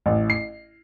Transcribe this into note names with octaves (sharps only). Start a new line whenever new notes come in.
A1
C7